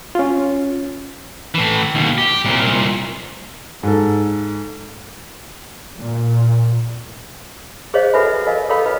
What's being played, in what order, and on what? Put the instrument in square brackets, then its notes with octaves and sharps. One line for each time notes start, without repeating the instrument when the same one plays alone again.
[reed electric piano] C#4 F4
[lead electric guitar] A2 E3
D#2 B2
G4
C2 A#2
[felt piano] G#2 A4
[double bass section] A#2
[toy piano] G#4 C5 C#5 D#5 F5
F#4 A4 B4 E5 G#5 B5
B4
A#4 D#5 F5 G#5
A4 A#4 C#5 F5 G5 B5
F4 B4 D#5